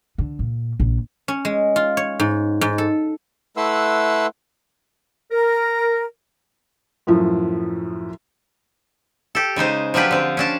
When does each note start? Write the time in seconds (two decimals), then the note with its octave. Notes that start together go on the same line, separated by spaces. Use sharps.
0.18 D3
0.39 A#2
0.80 A#1
1.28 C#4
1.45 G#3
1.76 F4
1.97 C#5
2.20 G#2
2.61 G#2
2.78 A4
3.57 A3 E4 B4 F#5 C6 E6
5.31 A#4
7.07 F#2 A2 F3
9.35 G4 A4
9.56 C#3 G#3 D#4 C5
9.94 F3 F#3 D4 F4 G4 B4
10.11 D3 C4
10.37 C#4 D4 A5